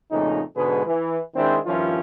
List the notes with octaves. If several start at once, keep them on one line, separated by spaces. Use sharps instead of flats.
F2 A#2 C#3 A3 D#4
G#2 B2 D3 G#3 G#4 B4
E3
D#3 G#3 C4 D4 E4 C5
G2 D#3 F3 C#4 E4 F4